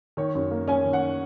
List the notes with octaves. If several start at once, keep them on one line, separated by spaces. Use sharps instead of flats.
D#3 C#5
F#2
A#3
C#4 G#5
D#3
F#5